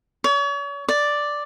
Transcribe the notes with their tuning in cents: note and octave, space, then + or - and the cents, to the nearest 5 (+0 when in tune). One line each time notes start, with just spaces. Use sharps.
C#5 +40
D5 +0